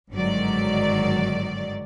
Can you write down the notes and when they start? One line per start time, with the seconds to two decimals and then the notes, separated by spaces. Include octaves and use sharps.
0.11 G1 G#2 D#3 F#3 D5